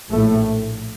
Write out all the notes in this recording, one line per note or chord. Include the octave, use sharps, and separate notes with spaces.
A#1 A2 A3